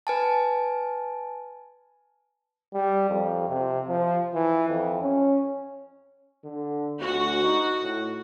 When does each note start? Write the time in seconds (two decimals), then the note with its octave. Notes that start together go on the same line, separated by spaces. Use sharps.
0.07 B4 G#5 A5
2.74 G3
3.10 F2
3.49 C3
3.88 F3
4.35 E3
4.69 F2
5.02 C#4
6.44 D3
7.00 D2 F#4
7.44 D#4
7.82 A2